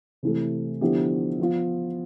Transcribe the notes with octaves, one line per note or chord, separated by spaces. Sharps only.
C3 E3 A3
D3 F3 B3 E4 G4
F3 B3 F4